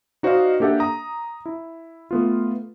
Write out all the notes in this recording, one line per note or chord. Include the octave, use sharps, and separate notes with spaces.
D#4 F#4 C5 D5 D#5 F5
A#3 D4 G4 A4 E5 F#5
A#5 D#6
E4
A3 B3 F4